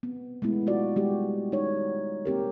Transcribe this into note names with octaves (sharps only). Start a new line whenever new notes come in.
B3 C4
G#3 A3 B3 E4
F4 F#4 D5
G3 G#3 F#4 G4
D#4 C#5
A#3 C4 G4 A#4